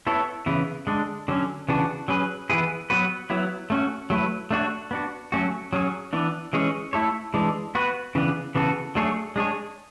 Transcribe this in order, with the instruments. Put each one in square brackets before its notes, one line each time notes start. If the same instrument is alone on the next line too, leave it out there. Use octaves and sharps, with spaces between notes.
[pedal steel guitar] B3 E4 A4 C#5
C#3 E3 B3 E4
D3 G#3 D4
D3 F#3 C#4
C#3 E3 B3 D4 F#4
F#3 C#4 G#4 B4
E3 B3 E4 G#4 B4
F#3 B3 F#4 B4
F#3 B3 E4
A3 C#4 F#4
F#3 A3 E4 B4
A3 D4 F#4 C#5
B3 D4 F#4
F#3 A3 C#4 F#4
F#3 C#4 G#4 C#5
E3 B3 D4
E3 G#3 C#4 G#4 C#5
A3 E4 A4 C#5
E3 G#3 D4
B3 F#4 B4
C#3 E3 B3 D4
C#3 E3 B3 F#4 A4
F#3 A3 D4 G#4 C#5
G#3 D4 G#4 C#5